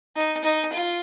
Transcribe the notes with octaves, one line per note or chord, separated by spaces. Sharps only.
D#4
D#4
F4